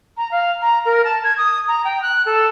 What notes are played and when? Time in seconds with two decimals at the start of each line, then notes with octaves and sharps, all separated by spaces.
0.17 A#5
0.31 F5
0.61 A#5
0.85 A#4
1.04 A5
1.24 G#6
1.38 D#6
1.68 A#5
1.85 G5
2.02 F#6
2.26 A4